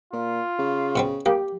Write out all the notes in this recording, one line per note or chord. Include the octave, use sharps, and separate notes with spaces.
A#2 F4
C#3
B2 B3 C4
A#3 G4